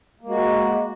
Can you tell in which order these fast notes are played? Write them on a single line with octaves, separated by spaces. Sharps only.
A#3 G#3 F#4